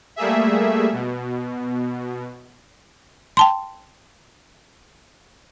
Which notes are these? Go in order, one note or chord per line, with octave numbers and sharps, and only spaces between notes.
G3 A3 A#3 G#4 E5
B2
G5 A5 C6